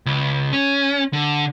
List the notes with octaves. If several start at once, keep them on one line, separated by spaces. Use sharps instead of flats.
C#2
C#4
D3